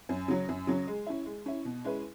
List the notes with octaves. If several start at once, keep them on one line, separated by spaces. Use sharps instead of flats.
F#2
C#3 F#3 C#4
F#2
C#3 F#3 C#4
G#3
C#4 E4
G#3
C#4 E4
B2
G#3 C#4 E4 B4